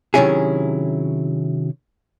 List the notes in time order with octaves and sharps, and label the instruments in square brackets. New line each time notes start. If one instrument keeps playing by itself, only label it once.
[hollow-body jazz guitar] C3 D#3 F#3 C#4 E4 G#4